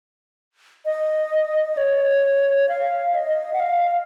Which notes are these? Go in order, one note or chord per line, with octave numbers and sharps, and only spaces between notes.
D#5
C#5
F5
D#5
F#5
F5